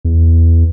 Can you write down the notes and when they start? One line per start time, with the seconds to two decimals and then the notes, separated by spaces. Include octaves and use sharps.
0.05 E2